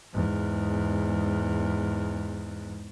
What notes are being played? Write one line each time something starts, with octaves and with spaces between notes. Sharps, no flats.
E2 G#2